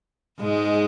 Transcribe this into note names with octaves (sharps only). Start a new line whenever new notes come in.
G#2 G#3